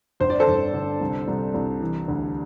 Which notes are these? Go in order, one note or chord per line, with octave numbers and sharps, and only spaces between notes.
G1 C5
D5
A4 C5
G1
D3
C2
C2
C2
E3
D2